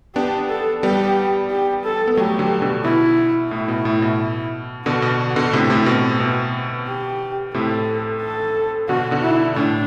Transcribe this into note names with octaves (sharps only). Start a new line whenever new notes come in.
B3 D4 G4
A4
G3 B3 G4
G4
A4
B3
F#3 A3 G4
D3 F#3
B2 D3
B2 E4
A2 E4
B2
A2
B2
B2 D3 F#4
B2
B2 D3
A2 C3 D4
A2 C3
B2 C4
B2 B3
G4
A2 C3 A4
A4
B2 D3 F#4
B2 D3
E4
A2 D4